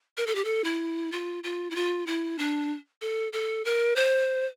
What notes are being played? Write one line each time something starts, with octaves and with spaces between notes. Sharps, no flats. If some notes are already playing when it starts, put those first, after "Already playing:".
A#4
A4
G4
A4
E4
F4
F4
E4
F4
E4
D4
A4
A4
A#4
C5